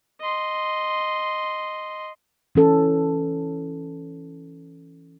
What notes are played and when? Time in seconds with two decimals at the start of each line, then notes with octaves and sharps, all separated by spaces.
0.20 D#5 C6
2.55 E3 C#4 A4